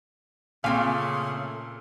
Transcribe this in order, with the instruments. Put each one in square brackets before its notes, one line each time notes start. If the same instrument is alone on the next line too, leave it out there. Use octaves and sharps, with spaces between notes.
[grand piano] A#2 [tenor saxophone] C#3 [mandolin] A3 C4 [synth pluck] F5 G#5